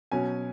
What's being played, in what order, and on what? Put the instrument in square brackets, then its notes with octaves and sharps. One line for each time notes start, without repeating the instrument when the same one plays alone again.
[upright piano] B2 F#3 C#4 G#5